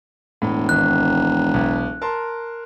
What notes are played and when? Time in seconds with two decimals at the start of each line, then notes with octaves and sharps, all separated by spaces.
0.42 E1 A2
0.69 G#1 D#3 F#6
1.54 B1
2.02 A#4 A5 C6